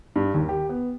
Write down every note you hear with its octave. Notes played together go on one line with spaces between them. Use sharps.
G2
D#2
G4
B3